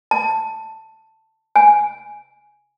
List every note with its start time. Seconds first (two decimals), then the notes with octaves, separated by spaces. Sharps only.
0.11 A5
1.56 G#5